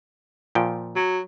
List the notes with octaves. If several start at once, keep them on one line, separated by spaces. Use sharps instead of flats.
A#2 F3 G5
F#3